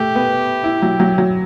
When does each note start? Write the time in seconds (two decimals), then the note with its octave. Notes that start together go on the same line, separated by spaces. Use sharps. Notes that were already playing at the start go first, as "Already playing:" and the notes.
Already playing: A3 G4
0.15 B3
0.64 E4
0.82 F#3
1.00 F#3
1.18 F#3